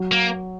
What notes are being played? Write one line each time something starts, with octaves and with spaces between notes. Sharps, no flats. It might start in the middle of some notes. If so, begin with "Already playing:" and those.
Already playing: F#3
A#3